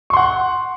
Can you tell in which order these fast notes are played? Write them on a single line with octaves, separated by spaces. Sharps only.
C#6 C6 F#5